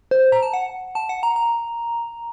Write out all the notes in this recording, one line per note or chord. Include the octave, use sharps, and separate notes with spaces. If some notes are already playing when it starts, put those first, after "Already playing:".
C5
A#5
A5
F#5
A5
F#5
A#5
A#5